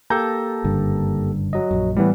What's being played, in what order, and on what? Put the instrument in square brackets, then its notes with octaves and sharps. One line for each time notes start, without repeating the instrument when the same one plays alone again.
[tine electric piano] A#3 G4 A4 [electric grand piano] A5 A#5 G6
[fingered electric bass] F#1 G2 D3
[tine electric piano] F#3 D#5
[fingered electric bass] A#1 F#2
[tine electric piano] A2 B3 [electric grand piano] E3 G3